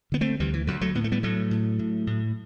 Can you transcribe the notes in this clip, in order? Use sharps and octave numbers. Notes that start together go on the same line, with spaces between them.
D3 B3
A3 C4
D2 E3 G3
E3
D2 D3 F#3
F#3 A3
A2 B3
A3
G3 B3
A2 F#3 A3
A2
A2
A2